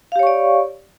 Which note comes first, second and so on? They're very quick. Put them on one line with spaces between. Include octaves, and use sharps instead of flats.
F5 G4 C#5 C#6 D5